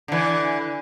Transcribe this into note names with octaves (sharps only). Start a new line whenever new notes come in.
D3 E3